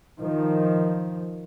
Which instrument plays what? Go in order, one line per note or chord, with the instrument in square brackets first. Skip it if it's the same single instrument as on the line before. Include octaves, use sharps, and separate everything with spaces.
[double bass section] D#3 F3